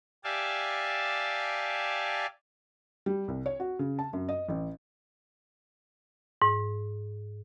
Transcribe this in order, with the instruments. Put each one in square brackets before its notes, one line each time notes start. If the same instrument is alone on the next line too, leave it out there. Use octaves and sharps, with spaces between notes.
[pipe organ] G4 D5 E5 F5 G#5 A5
[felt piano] G3
C2
C#5
F#4
C#3
A5
F#2
D#5
A1
[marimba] G#2